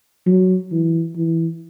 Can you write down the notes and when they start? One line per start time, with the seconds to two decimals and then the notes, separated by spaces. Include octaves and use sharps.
0.26 F#3
0.72 E3
1.15 E3